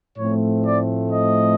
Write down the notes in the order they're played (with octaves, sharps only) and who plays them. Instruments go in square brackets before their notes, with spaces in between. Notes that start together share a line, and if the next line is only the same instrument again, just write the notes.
[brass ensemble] A2 F3 A3 C4 C#5
D5
D#5